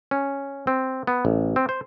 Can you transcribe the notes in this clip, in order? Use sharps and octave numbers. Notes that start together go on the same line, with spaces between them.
C#4
C4
B3
A1
C4
C5